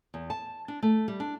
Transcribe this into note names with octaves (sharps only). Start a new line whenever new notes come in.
E2
A5
D4
A3
G3
D4